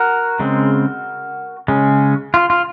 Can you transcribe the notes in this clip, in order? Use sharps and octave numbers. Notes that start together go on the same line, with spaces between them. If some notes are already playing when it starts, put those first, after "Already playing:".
Already playing: F#4 A#4
C#3 G#3 C4
C#3 G#3 C#4
F4
F4